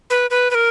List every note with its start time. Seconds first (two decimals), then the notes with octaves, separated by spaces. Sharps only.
0.10 B4
0.30 B4
0.51 B4
0.55 A#4